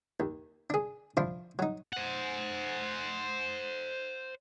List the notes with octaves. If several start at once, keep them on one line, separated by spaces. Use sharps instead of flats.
D#2
D4 G#4
F3 D4 E4 F4
F#3 D#4
C5 F#5